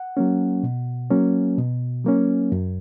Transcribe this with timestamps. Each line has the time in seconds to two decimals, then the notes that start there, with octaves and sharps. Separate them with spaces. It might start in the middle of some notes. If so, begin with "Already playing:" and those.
Already playing: F#5
0.17 F#3 A#3 C#4
0.63 B2
1.10 F#3 A#3 C#4
1.58 B2
2.04 F#3 A#3 C#4
2.52 F#2